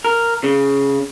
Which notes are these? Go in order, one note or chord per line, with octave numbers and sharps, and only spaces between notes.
A#4
C#3